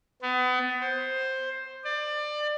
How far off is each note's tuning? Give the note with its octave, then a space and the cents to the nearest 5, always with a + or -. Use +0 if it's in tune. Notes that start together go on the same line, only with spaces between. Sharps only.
B3 +30
C5 +10
D5 +25